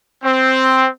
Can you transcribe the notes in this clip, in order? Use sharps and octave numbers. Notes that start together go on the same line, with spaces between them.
C4